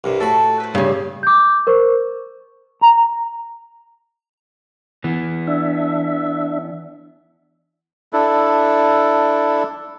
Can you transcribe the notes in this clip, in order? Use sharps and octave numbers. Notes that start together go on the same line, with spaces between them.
C2 G2 C3
A2 F#4 A4 B5
B4 C5
G2 C#3
D6 G6
A#4 C5 C#6
A#5
E3 B3
D4 E5
D4 E4 A4